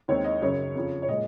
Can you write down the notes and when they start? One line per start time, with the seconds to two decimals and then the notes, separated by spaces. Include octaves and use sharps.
0.08 D#2 D#3 G#3 C4 C#5
0.24 D#5
0.42 F#2 C#3 F#3 C#5
0.75 F2 C#3 F3
1.02 C#5
1.08 A#2 G#3 D#5